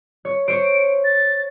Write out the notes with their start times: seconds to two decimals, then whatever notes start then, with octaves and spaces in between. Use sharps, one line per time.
0.25 C#5
0.48 C5 C#5 D7
1.04 A6